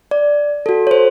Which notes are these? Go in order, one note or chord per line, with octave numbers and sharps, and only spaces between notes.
D5
F#4 A4
C5 C#5